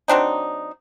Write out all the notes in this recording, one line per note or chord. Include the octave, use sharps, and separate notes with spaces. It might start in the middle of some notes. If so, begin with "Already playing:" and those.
F#3 C4 D4 D#4